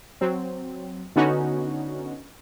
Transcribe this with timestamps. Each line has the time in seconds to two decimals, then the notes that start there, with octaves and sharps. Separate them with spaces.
0.21 F#3 C4
1.16 D3 B3 C#4 D#4 F#4